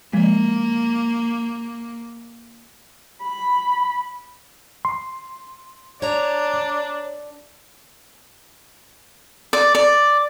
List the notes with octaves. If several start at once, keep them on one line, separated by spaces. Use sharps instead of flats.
F3 G#3 A#3
B5
C6
D4 C#5 A#5
D5
D5